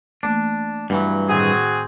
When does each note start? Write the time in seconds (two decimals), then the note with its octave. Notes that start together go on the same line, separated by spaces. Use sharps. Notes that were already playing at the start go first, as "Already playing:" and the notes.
0.23 E3 A3 A#3 D4
0.90 G2 E3 F#3 F#5
1.29 A2 D#3 C4 F#4 G#4 G#6